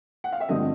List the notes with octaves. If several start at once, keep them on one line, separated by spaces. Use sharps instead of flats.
F#5
F5
E5
G2 D3 F3 A3 C4 D#5